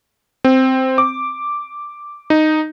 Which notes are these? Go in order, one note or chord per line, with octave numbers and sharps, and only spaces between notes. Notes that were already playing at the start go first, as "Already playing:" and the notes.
C4
D6
D#4